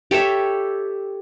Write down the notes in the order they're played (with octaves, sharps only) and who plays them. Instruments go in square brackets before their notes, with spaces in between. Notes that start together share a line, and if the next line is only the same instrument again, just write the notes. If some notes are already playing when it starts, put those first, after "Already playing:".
[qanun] G4 A4 C#5 E5